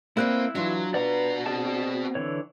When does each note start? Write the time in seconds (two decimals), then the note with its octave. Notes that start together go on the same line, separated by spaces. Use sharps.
0.17 A#3 C4 E4 B4 D5 F#6
0.55 E3 F#3 D4 F4
0.94 B3 F#4 B4 D5 A#5
1.46 C4 G#4 D5 A5
2.15 D3 E3 C#5